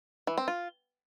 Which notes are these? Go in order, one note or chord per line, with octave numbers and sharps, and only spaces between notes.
E3
C4
F4